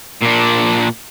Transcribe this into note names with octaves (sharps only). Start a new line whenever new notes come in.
A#2 D4